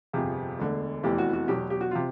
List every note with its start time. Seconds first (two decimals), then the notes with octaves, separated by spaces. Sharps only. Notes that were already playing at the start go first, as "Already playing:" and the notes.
0.13 G1 F2 C3 G#4
0.59 E1 D2 D3
1.03 F1 E2 C3 E3 G4
1.18 F#4
1.33 F#4
1.48 E2 B2 F#3 G4
1.70 G4
1.81 F#4
1.91 C3 F4